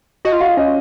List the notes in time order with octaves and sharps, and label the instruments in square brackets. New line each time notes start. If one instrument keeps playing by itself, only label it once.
[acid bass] F#4 [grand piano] D#5
[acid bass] F4
[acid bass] F#4 [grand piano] F5
[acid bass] F4
[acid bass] C#4 [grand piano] D#5